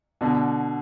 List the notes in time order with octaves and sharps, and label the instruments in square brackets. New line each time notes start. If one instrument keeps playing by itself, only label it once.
[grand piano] B2 D3